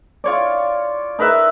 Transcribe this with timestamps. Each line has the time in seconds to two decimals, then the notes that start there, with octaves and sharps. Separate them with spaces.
0.24 F4 C#5 D5
1.19 D#4 A#4 B4 E5